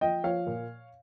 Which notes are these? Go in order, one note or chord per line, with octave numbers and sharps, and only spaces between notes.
F3 D#5 G5
F3 C#5 F5
A#2